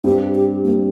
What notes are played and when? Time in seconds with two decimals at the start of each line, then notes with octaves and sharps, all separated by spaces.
0.04 G2 G3 C4 G4
0.35 G4
0.64 G2 G3 A#3 C4